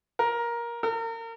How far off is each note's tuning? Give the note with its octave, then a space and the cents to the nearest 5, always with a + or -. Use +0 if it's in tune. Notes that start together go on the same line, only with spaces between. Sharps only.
A#4 +15
A#4 -35